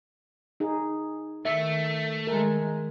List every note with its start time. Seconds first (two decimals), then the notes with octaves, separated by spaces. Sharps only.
0.60 D#4 G#4
1.45 D#3 A3 E5
2.27 D#3 G#3 A#4